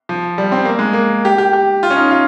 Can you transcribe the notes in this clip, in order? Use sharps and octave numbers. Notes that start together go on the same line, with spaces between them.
F3
G3
C4
A#3
G#3
A#3
G4
G4
G4
F4
C#4
D#4
F4